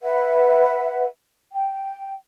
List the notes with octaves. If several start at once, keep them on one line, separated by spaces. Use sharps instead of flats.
B4 E5 F#5
G5